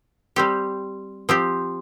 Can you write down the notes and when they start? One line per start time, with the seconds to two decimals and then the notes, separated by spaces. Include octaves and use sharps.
0.36 G3 C4 G4
1.29 F3 C4 G4